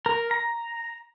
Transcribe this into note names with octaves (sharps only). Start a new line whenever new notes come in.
A#4
A#5